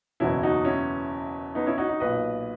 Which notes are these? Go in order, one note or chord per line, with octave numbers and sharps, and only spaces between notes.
F#1 E2 B2 C#4 E4
D#4 F#4
C#4 E4
B3 D#4
C#4 E4
D#4 F#4
D#4 F#4
B1 A#2 B4 D#5